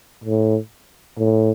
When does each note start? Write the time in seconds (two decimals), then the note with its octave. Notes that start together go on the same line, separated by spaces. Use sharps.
0.24 A2
1.18 A2